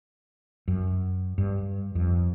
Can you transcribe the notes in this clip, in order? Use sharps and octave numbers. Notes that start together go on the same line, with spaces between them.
F#2
G2
F2